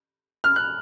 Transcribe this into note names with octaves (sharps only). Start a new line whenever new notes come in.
F6
F#6